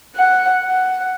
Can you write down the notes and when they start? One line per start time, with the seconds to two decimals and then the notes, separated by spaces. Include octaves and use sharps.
0.15 F#5
0.63 F#5